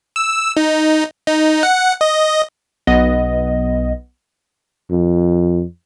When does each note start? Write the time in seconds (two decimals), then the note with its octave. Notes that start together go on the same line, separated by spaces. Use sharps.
0.16 E6
0.57 D#4
1.27 D#4
1.63 F#5
2.01 D#5
2.87 B1 B3 D#5
4.91 F2